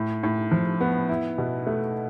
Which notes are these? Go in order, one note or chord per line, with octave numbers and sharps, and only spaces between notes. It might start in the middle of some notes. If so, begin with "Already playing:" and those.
Already playing: A2
A2
F3
B3
E4
B2
A3